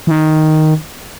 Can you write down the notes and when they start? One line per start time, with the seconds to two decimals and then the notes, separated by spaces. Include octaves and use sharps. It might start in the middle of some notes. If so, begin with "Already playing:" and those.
0.07 E3
0.11 D#3